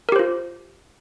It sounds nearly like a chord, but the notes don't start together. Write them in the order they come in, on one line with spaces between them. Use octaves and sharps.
A#4 G4 C5 F4